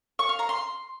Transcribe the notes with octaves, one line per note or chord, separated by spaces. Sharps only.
C#6
F5
A#5
C6